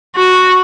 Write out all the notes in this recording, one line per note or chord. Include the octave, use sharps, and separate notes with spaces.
F#4